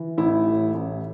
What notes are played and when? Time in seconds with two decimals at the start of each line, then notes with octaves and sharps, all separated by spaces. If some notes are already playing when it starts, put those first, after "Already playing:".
Already playing: E3
0.18 A1 E4
0.47 A2
0.74 A1